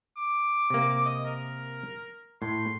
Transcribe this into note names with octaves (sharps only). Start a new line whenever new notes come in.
D6
C3 A#3
D#5
A#4
A2 C6